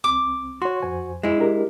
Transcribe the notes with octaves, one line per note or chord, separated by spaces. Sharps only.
C2 C4 D6
F#4 C#5 C6
F2 C5 G#5
G#3 E4
D4 G4 A#4